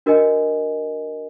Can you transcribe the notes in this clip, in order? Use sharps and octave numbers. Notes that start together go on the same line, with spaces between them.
D4 F#4 A#4 D#5 G#5